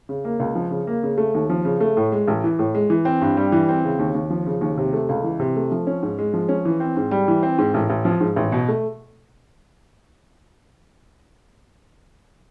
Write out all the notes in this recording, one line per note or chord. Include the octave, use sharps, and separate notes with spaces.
C#3
A#3
C#2
F3
C#3
A#3
C#3
A3
D#2
F3
C#3
A3
A2
G#3
A1
E3
A2
G#3
E3
C4
G2
G3
E3
C4
C#3
D#2
D#2
F3
C#3
D#2
C3
A3
C#2
E3
C3
A3
F3
C#4
G#2
G#3
F3
C#4
E3
C4
G#2
G3
E3
C4
G#2
A1
A1
F3
G#2
A1
B2
A3